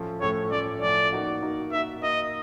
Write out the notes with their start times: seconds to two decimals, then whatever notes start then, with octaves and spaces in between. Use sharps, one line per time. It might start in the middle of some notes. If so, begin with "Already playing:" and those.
Already playing: A2 F3 A3 C#4
0.21 A2 F3 A3 C#4 C#5
0.51 A2 F3 A3 C#4 D5
0.81 A2 F3 A3 C#4 D5
1.12 A#3 D#4 F#4
1.43 A#3 D#4 F#4
1.72 A#3 D#4 F#4 E5
2.02 A#3 D#4 F#4 D#5